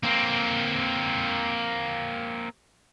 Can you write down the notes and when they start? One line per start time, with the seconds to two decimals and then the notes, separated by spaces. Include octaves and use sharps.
0.03 A#3 C4